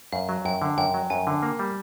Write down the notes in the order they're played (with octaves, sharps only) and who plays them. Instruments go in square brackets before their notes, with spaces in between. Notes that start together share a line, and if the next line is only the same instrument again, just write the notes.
[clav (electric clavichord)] F#2 [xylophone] F5
[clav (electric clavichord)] F#3
[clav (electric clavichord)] F#2 [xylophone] G5
[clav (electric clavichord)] D3
[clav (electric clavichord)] F#2 [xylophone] G5
[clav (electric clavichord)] F#3
[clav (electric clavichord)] F#2 [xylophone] G#5
[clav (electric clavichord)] D3
A#3
G3